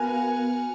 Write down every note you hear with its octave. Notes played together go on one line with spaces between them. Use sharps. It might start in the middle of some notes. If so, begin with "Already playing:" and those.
Already playing: B3 F#4 A#4 F5 G#5